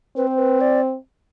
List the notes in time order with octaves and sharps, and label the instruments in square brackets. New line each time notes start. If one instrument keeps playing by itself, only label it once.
[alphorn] C4 [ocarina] B4
[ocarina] C5
B4
D5